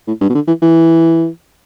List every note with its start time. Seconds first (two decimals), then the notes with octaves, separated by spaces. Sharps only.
0.07 A2
0.21 G2
0.30 B2
0.35 D3
0.48 E3
0.62 E3